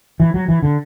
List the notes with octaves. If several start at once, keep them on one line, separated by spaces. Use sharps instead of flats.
E3
F#3
E3
D3